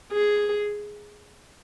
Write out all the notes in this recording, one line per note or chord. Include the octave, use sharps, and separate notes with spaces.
G#4